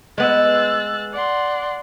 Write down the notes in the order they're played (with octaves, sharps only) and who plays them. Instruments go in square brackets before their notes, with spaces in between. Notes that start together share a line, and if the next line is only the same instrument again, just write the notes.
[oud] G#3 B3 [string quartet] E6 F#6 A6
[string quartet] D5 F#5 C6